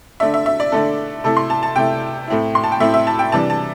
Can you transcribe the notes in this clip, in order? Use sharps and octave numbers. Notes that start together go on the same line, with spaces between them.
D3 A3 D4 E5
E5
E5
D5
D3 A3 D4 A4
C3 A3 E4 A4
C6
A5
A5
C3 A3 E4 G5
A2 A3 C4 E4
C6
A5
G5
A2 A3 C4 E4 E5
E5
A5
G5
C3 E3 G3 D4 A5
A5